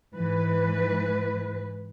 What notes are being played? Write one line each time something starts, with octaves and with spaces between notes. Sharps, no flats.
G#2 E3 B4